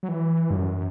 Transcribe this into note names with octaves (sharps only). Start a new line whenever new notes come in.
F#3
E3
G2
F#2